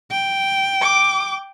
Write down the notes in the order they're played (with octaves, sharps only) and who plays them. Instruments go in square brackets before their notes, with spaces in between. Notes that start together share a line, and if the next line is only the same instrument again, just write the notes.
[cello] G5
[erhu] D6